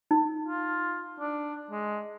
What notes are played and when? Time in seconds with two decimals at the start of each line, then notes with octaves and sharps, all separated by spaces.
0.11 D#4
0.48 F4
1.20 D4
1.71 G#3